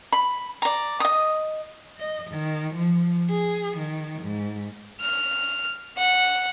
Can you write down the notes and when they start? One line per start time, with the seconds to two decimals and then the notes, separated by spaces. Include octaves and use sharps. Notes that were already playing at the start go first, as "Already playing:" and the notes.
0.12 B5
0.62 D5 A#5
1.00 D#5 D#6
1.98 D#5
2.31 D#3
2.76 F3
3.29 G#4
3.78 D#3
4.23 G#2
5.01 F6
5.97 F#5